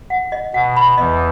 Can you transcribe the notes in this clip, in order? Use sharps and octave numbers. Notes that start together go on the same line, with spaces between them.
F#5
D#5
B2 F#5
B5
E2 E3 D#5